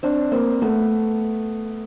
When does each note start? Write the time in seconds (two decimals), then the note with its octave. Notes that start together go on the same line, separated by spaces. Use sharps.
0.03 C4 D4
0.32 A#3 C4
0.62 A3 B3